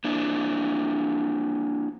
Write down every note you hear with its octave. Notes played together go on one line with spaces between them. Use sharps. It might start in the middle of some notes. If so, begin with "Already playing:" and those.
A#3 D4 E4